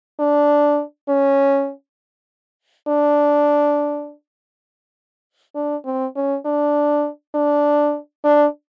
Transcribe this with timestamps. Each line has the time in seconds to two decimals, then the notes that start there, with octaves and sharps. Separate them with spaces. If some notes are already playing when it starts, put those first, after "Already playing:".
0.20 D4
1.09 C#4
2.88 D4
5.55 D4
5.85 C4
6.16 C#4
6.45 D4
7.35 D4
8.24 D4